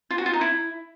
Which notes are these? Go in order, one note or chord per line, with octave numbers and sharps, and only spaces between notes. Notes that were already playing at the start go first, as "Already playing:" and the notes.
F4
F#4
F4
D#4
E4